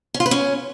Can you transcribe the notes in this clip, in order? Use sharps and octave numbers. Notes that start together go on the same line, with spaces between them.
C#4
F4
B4
C#4